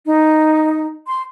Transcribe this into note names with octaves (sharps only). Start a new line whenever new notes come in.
D#4
C6